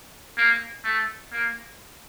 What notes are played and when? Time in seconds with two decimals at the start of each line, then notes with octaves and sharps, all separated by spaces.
0.37 A#3
0.84 A3
1.32 A#3